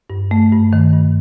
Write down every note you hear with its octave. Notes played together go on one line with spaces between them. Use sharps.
G2
A3
G2
D#3
G2